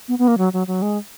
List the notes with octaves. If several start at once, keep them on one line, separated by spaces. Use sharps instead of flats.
B3
B3
A#3
F#3
F#3
F#3
G#3